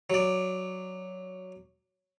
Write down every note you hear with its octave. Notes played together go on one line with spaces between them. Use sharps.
F#3 D5